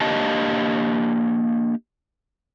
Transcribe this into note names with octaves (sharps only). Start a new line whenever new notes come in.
A#3 D4 G4 D#5 F5 A5